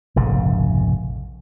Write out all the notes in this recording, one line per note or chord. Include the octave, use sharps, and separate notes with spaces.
F1 A#1 G#2 C#3